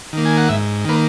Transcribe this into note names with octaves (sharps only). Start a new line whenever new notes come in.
D#3 A#3
G#5
F#5
G#2 E5
D#3 A#3 B4